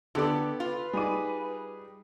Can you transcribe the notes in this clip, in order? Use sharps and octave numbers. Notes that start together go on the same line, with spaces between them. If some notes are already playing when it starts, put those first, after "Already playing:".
D3 B3 G4 A4 D5
F4 B4
G3 D#4 G#4 D6 D#7